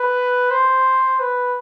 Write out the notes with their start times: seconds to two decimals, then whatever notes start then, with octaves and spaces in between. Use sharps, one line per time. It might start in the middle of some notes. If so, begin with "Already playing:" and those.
Already playing: B4
0.51 C5
1.20 B4